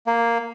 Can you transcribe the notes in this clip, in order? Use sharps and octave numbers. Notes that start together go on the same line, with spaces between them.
A#3